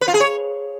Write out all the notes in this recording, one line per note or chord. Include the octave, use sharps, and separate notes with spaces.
B4
F4
G#4
C#5